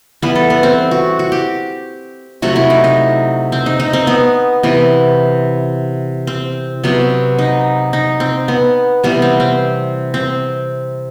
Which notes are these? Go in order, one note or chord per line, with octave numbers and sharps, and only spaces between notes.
E3 G3 B3 B4
A4
B3
C4
F#4
F#4
G4
C3 F#3 A3 F#4
E4
D#4
D#4
C4
D#4
D#4
C4
B3
C3 E3 B3
C4
C3 F#3 B3
D#4
D#4
C4
B3
C3 E3 G3 B3
C4
C4
C4